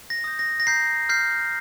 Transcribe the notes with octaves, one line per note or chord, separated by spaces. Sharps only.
A#6
D#6 G6
A#6
A#6
A#5 G6 C7
F6 G6 C7